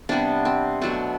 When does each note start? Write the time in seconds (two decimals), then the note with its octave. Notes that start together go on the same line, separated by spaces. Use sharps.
0.09 C3 G3 B3 D4
0.45 C4
0.81 B2 F#3 A3 D4